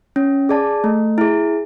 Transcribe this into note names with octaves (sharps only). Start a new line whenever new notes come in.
C#4
G#4 D5 A5
A3
E4 G#4